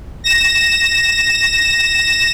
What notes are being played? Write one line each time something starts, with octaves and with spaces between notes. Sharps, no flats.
A#6 E7